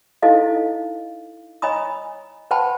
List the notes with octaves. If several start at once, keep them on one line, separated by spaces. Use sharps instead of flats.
D#4 E4 A4 C5 D#5 F5
C#5 D#5 G#5 A#5 B5 D#6
B4 C5 F#5 G5 A5 B5